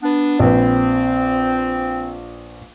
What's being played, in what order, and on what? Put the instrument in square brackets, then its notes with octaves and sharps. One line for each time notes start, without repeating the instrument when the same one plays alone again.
[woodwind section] B3 D4
[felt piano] A#1 B4 [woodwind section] C4